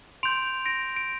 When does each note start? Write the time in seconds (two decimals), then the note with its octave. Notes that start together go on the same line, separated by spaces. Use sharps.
0.23 C6 G6 D7 F7
0.66 A#6 D7
0.96 D7